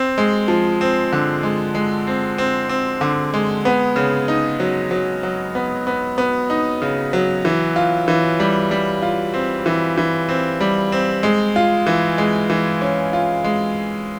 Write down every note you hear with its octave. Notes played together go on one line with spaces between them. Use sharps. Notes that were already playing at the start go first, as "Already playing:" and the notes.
Already playing: C4
G#3
F3
C4
D3
G#3
G#3
C4
C4
C4
D3
G#3
B3
C#3
D#4
F#3
F#3
F#3
B3
B3
B3
D#4
C#3
F#3
E3
F4
E3
G3
G3
F4
C4
E3
E3
C4
G3
C4
G#3
F4
E3
G#3
E3
C#4
F4
G#3